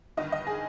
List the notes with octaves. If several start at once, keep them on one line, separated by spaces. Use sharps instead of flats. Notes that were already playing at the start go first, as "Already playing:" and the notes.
G1 G2 D#3 D#5
D#5
G#4